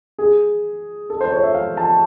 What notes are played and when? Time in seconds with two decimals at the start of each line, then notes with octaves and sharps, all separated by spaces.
0.18 G#4
1.10 A4
1.21 C5
1.32 C#5
1.43 E5
1.54 F5
1.77 A5